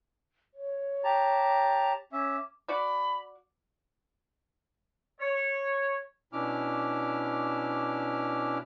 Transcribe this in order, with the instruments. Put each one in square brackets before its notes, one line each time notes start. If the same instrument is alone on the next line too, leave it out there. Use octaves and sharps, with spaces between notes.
[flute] C#5
[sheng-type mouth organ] G4 A5 A#5
[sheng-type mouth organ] C#4 E5 [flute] D6
[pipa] F#4 D5 [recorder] B5
[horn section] C#5
[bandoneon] B2 C#4 D4 E4 D6 F6